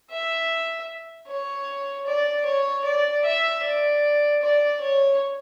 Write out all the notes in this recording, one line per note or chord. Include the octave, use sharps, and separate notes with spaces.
E5
C#5
D5
C#5
D5
E5
D5
D5
C#5